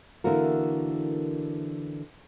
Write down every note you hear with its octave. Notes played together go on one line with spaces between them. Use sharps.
D3 E3 A#3 F#4 A#4